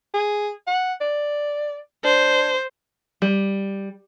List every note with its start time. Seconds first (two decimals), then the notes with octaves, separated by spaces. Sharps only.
0.14 G#4
0.67 F#5
1.01 D5
2.04 D4 C5
3.22 G3